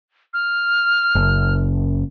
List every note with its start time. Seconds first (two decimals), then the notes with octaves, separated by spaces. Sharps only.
0.34 F6
1.15 F#1